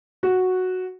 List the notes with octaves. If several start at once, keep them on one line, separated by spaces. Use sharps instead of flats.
F#4